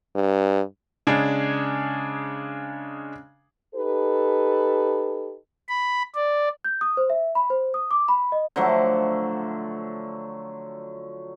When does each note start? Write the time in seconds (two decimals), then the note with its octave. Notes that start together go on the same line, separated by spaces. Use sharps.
0.15 G2
1.07 C#3 G#3 D4 G#4 G#6
3.75 D#4 G4 A4 B4
5.69 B5
6.15 D5
6.64 G6
6.81 D#6
6.97 C5
7.10 E5
7.35 B5
7.50 C5
7.74 D#6
7.91 D6
8.08 B5
8.32 D#5
8.56 D3 F3 F#3 A3